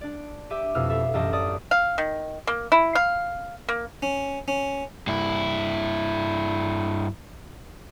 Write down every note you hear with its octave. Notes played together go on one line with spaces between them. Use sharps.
D4 D5
G4 E5 D6 D#7
F2 B2 E4 E6 F6
A4 E5 F5
A1 F#2 G4 D#5 A5 A#6
D5 A5 D#6
F5
D#3
A#3
E4
F5
A#3
C#4
C#4
G2 E4